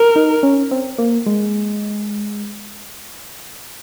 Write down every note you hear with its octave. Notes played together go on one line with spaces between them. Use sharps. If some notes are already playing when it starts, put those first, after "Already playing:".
Already playing: A#4
D#4
C#4
C4
A#3
G#3